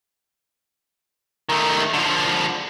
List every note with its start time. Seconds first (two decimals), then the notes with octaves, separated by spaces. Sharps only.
1.49 D#3 A3
1.94 D3 F3